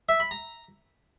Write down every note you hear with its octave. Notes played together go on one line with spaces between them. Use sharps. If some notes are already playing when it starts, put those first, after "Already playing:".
E5
B5
A#5